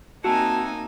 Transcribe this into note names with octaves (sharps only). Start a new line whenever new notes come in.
A#3 C4 D#4 F#4 E5 F#5 G#5 A5